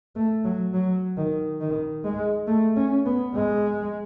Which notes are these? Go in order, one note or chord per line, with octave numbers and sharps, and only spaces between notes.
A3
F#3
F#3
D#3
D#3
G#3
A3
C#4
B3
G#3